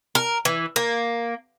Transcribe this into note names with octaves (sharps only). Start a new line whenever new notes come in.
A#4
E3
A#3